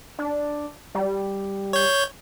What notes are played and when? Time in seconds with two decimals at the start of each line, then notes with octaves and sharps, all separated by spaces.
0.19 D4
0.95 G3
1.73 C#5 G6